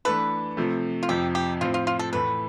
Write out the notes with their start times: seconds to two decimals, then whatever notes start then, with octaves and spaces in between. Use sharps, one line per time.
0.05 E3 A3 D4 A4 B4
0.57 C3 F3 A3
1.03 F4
1.09 F2 C3 F3 G4
1.35 G4
1.61 A2 F3 C4 F4
1.74 F4
1.87 F4
1.99 A4
2.13 A2 E3 A3 B4